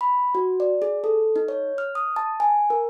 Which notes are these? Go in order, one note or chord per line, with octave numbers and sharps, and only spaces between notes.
B5
F#4
D5
G#4
A4
D#4
C#5
F6
D#6
A5
G#5
A#4